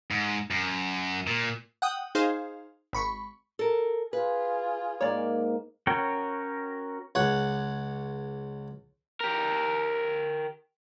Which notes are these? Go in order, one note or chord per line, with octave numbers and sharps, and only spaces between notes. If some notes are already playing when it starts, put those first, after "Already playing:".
G#2
F#2
A#2
F#5 G5 D#6
D#4 G#4 C5 F5
G#1 B5 C#6
A4 A#4
F4 G#4 B4
G#2 A#3 C#5 D5
C#4 F#4 A#4 C#5 G5
C#2 C#5 F#5
G4 A#4